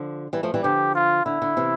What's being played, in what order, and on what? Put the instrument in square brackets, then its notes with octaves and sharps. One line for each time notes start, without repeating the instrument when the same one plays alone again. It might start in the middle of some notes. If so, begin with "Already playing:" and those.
Already playing: [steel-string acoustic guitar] D3 F3
E3 G3
F3 A3
E3 G3
[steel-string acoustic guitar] D3 F3 [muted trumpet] G4
[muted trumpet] F4
[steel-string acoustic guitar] D3 [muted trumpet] E4
[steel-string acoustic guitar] D3
C3 E3